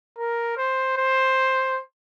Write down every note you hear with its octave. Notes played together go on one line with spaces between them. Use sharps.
A#4
C5
C5